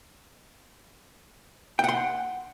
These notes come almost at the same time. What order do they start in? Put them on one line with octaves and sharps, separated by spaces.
G5 F#5 C6